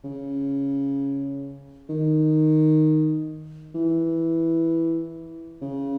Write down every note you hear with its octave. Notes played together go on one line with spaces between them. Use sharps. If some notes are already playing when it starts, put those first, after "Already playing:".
C#3
D#3
E3
C#3